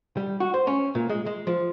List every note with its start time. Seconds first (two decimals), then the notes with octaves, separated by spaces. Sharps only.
0.17 G3
0.40 F#4
0.54 C5
0.67 C#4
0.95 A#2
1.09 G#3
1.26 G#3
1.47 F3